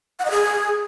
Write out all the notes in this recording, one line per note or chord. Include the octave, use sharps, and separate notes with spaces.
F#5
D#5
G#4